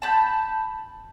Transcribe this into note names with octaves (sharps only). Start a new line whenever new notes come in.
A5 B5 G6